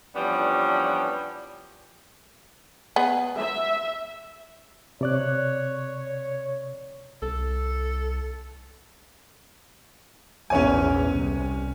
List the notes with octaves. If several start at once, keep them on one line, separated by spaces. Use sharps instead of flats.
E3 F3 G3 B3 C#4 D4
B3 G#4
E5
C3 C#5 D5 F#6
C2 A4
A#1 E2 G#2 C#4 C#5 G#5
C2